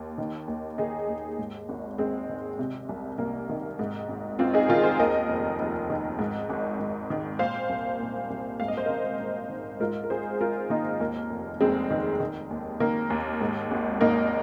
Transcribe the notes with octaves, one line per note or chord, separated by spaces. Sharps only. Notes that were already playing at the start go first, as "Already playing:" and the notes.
Already playing: D#2
D#3
D#2
D#3 D#4 G#4
D#2
G#2
G#1
G#1 G#3 C4
D#3
C3
C2
C2 A#3
D#3
G#2
G#1
G#1 C4 F4
D#4 G#4
D#3 F4 A#4
G#4 C5
D#2 A#4 D#5
F1
F1
D#3
G#2
G#1
G#1
D#3
A#2 C5 F5
C2
A#2
C2
G#2 F5
D#5
C5
G#1 A#4 D#5
G#1
D#3
G#2 F4 A#4
A#4
G#1 G#4 C5
G#1 F4 A#4
D#3 A#3 D#4
D#2 A#3
F1
F1 G#3 C4
D#3
D#3
D#2
D#3 A#3
D#2
G#2
G#1
G#1 A#3 D#4